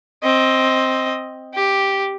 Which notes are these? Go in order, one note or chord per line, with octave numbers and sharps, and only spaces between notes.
C4 D#5
G4